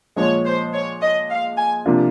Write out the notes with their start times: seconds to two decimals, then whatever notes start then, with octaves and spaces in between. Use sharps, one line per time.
0.16 A#2 F3 G#3 C#5
0.45 C5
0.73 C#5
1.01 D#5
1.29 F5
1.57 G#5
1.86 C3 F3 A#3 D4 F4